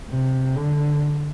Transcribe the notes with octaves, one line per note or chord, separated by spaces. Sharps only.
C3
D3